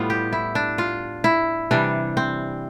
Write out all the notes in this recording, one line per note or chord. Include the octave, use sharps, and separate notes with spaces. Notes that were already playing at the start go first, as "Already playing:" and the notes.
Already playing: A2 G3 B3 F4
G4
E4
D4
F4
E4
C3 E3 G3 D4
C4